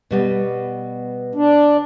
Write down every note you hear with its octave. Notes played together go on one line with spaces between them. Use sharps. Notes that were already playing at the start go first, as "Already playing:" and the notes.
B2 G3 B3
D4